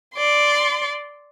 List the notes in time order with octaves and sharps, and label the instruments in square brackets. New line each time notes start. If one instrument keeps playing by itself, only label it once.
[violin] D5 C6